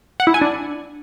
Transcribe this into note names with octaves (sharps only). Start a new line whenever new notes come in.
F#5
E4
G#5
D4